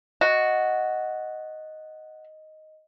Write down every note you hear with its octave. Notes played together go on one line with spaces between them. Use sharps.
F#4 D#5